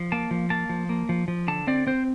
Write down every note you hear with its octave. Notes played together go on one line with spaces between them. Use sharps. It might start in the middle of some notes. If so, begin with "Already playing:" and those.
Already playing: F3
A#3 A5
F3
A#3 A5
F3
A#3
F3
F3
D3 A5
C4 D5
C4 C5